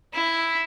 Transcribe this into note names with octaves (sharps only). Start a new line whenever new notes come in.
E4